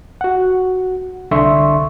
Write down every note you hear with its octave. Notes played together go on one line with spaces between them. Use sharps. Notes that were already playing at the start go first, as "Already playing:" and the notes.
F#4 F#5
C2 D3 E5 C6 C#6